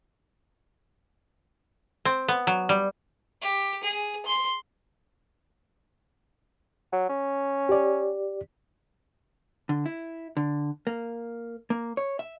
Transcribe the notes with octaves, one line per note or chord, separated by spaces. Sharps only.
C4
B3
F#3
G3
G4
G#4
C6
F#3
C#4
G4 D5
D3
E4
D3
A#3
A#3
C#5
E5